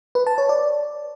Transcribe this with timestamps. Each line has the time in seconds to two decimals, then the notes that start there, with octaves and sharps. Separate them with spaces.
0.15 B4
0.27 A5
0.38 C#5
0.49 D5